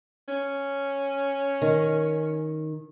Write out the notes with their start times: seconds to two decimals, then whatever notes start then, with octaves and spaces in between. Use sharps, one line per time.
0.28 C#4
1.62 D#3